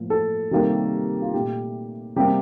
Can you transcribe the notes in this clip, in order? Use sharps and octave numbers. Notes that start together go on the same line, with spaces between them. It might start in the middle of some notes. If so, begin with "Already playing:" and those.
Already playing: A2 F3 A#3
A4
C3 D#3 G3 A#3
F4
A#2 A3 G4
C3 G3 A#3 G4